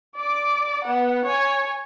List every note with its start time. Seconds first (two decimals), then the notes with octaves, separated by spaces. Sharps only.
0.16 D5 D6
0.84 B3 F#5
1.25 C#5 G#5